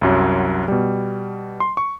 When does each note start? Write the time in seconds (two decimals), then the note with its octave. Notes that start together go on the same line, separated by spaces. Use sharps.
0.01 C2 F#2 F#3
0.68 B2 G3
1.60 C6
1.77 C#6